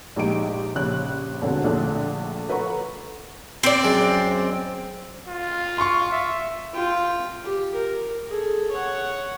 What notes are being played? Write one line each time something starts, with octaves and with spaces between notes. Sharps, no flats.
A#1 G#3 D#4 G4 D7
A#1 C#3 G4 C#5 F#6
E1 D3 C4 F#4 G#4
A#1 D3 F3 A3 F#6
A4 B4 F#5 A#5 C#6
C4 D5
F#2 G#3 C5
F4
C6 C#6
E5
F4 G5
G4
A#4
G#4 A4
C#5 F#5